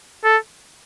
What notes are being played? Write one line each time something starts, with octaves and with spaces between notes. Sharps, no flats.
A4